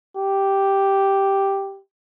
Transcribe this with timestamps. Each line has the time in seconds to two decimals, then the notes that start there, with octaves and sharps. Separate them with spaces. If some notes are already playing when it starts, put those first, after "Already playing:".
0.17 G4